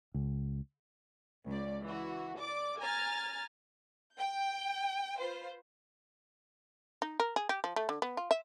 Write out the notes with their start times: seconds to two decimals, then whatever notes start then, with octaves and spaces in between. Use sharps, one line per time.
0.14 C#2
1.47 C#2 D5
1.83 E3 F#4
2.40 D5 D6
2.80 G#5 A#5 F6 A6
4.15 G5 G6
5.16 F4 B4 C5
7.02 D#4
7.20 A#4
7.36 G#4
7.49 G4
7.64 F3
7.76 A3
7.89 D3
8.02 B3
8.17 F4
8.31 E5